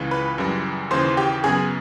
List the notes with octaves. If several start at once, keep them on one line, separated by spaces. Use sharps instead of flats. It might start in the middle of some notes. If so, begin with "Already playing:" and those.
Already playing: C#2 C#3 E3
B4 B5
F#2 C#3 E3 G3
D#2 C#3 E3 C5 C6
G4 G5
F#2 C#3 F#3 B3 G#4 G#5